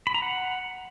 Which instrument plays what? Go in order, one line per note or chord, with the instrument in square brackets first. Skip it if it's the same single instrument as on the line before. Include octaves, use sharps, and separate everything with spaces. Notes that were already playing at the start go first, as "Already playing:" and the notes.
[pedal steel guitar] B5
A#5
F#5